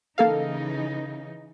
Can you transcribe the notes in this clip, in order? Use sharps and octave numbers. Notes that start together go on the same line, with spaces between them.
C#3 E3 A#3 D#4 A4 F5